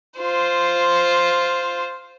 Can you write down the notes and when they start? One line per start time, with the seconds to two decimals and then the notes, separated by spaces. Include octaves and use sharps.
0.20 F4 C5